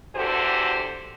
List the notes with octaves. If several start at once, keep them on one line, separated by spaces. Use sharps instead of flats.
E2 D3 F#4 G4 A4 C5